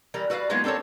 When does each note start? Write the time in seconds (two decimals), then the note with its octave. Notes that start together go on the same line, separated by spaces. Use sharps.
0.14 E3 G3 A#4
0.30 F#4 B4 D5 E5 F5
0.50 F#3 G#3 A#3 B3 D#4 F4
0.64 C4 D4 A4 A#4 C#5